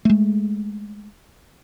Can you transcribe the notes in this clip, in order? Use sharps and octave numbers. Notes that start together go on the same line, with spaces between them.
G#3 A3